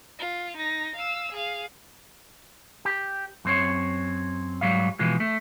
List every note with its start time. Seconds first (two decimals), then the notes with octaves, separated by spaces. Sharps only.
0.19 F4
0.57 D#4 A#6
0.95 F5 E6
1.32 G#4 F5
2.85 G4
3.45 F#2 C4 C#5
4.61 G#2 D#3 F#3 G3 F5
4.99 B2 E3 F3 G#3
5.20 A3